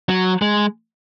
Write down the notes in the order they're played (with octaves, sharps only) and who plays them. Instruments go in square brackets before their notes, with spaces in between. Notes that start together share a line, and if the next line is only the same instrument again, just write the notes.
[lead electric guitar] F#3
G#3